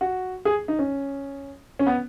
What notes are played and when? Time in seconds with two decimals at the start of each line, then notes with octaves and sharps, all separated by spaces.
0.01 F#4
0.45 G#4
0.68 D#4
0.79 C#4
1.79 C#4
1.87 B3